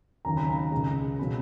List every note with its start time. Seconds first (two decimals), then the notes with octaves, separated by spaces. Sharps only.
0.25 D#2 C#3 F#3 A#5
0.37 B5
0.50 A#5
0.72 C#2 C#3 G#3
1.19 B2 F#3 B5